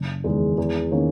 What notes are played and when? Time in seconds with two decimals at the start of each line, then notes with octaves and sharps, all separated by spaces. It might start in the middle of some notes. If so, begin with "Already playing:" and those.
Already playing: F#1
0.24 E2 D#3 G#3
0.58 E2
0.91 D#3 A#3 C#4